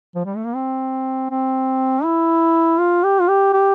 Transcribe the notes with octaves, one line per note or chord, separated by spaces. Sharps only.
F3
G3
A3
A#3
C4
C4
E4
F4
G4
F4
G4
G4